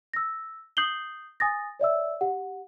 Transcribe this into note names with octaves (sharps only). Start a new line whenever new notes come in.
E6 A#6
D#6 G6 C7 F#7 G7
G#5 D#6 A6 A#6
C#5 D5 E5 E6
G4 F#5